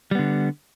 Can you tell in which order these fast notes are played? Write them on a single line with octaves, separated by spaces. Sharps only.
G3 B3 D3